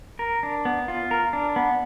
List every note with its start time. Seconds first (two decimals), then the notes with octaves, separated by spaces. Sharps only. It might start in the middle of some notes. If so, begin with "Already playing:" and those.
0.19 A#4
0.43 D4
0.65 B3
0.88 F4
1.11 A#4
1.33 D4
1.56 B3